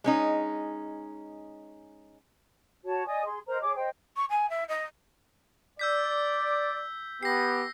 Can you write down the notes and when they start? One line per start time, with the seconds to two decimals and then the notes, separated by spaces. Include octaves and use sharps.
0.04 G#3 C#4 D#4
2.84 F#4 C#5 A5
3.06 D5 D#5 G#5 D#6
3.24 G#4 C6
3.47 A#4 C5 D#5 A#5
3.61 G#4 C#5 D6
3.76 C5 D#5 G5
4.16 C#6
4.29 G#5
4.49 E5
4.68 D#5
5.79 D5 E6 G6 B6
7.23 B3 G4 A#6 C7